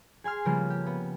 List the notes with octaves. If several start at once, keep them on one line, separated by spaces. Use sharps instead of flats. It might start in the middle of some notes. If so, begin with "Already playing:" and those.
G#4 G#5 C6 F6
C#3 F3 G3 A#3 B3
G4
B3